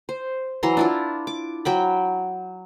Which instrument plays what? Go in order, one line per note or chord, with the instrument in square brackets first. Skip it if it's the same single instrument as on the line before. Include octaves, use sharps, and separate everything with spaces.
[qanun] C5
E3 F#3 A#5 C6
D4 E4 F4
D6
F#3 G5 B5